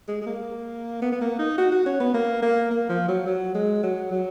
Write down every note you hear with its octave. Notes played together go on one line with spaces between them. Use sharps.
G#3
G#3
A#3
B3
B3
A#3
D#4
F#4
F#4
C#4
B3
A#3
A#3
A#3
F3
F#3
F#3
G#3
F#3
F#3